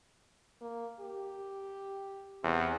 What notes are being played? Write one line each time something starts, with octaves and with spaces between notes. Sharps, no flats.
A#3
G4
E2 C3